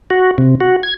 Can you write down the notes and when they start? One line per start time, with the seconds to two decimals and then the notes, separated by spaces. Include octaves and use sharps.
0.10 F#4
0.38 C3
0.61 F#4
0.83 G#6